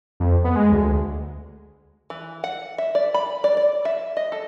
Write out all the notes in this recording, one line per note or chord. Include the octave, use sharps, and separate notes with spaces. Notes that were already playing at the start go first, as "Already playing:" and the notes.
F2
B3
G#3
D2
E3
F#5
E5
D5
B5
D5
D5
E5
D#5
A4